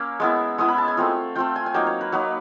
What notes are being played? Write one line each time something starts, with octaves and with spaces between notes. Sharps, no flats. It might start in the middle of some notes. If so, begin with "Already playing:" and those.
Already playing: A#3 C#4 E6
G#3 B3 E4
G#3 B3 E4 D#6
B5
A5
G#5
A3 C4 F4
A3 C4 F4 G5
G#5
G#5
F#3 A#3 D#4 G5
C#5
B4
F#3 A#3 D#4 B4